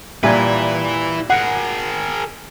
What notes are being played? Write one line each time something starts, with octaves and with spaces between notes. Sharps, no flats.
A#2 G3 E4 B4 E5 G#5
G#4 A#4 F#5